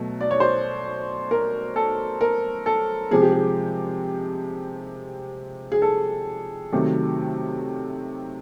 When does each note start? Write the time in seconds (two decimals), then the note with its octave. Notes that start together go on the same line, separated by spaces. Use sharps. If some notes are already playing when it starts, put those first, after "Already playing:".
Already playing: B2 F#3 A3
0.21 D5
0.31 C#5
0.40 C5
1.31 A#4
1.76 A4
2.21 A#4
2.66 A4
3.11 C3 F3 G#3 G#4
3.22 G4
3.32 G#4
5.72 G#4
5.82 A4
6.72 C3 D#3 F#3 A3